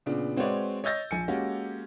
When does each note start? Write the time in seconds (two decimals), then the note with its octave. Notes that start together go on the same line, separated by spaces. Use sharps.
0.06 A#2 C#3 B3 D4
0.36 G#3 C4 F#4 B4 C#5 D5
0.84 C#5 D#5 E6 G6 A6 A#6
1.11 A#1 G#5 C#7
1.28 G#3 A#3 C#4 F#4 G4